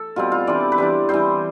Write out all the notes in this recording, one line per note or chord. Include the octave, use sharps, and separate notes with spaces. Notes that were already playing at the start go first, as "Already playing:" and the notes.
Already playing: A4
B2 G3 C4 F4
F4
E3 G3 D4 D5
B4
E3 G3 D4 C5
E3 G3 C4 C5